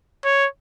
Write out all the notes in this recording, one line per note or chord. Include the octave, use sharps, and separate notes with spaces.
C#5